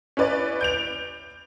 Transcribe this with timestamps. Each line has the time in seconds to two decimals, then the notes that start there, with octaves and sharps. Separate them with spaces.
0.17 C#4 E4 B4 D5
0.61 G6 D7 F7